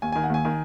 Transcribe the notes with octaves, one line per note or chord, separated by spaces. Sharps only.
D#2 G#5
D#3 G#5
F#5
D#2 G#5
D#3